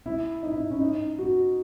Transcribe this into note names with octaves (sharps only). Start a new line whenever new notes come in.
E4
D#4
E4
C#4
D#4
F#4